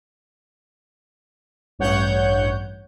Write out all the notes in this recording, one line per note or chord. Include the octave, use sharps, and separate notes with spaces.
A1 G2 C#5 F#5 G6